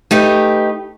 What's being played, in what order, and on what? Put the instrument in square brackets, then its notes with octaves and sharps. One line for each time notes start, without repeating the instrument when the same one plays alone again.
[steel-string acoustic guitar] A3 D#4 G4 B4